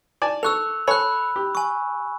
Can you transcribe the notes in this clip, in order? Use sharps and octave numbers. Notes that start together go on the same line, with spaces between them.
D5 G#5 A5
A4 C#6 E6 F#6 F7
A4 C#5 G#5 B5 F#6
G4
G#5 C#6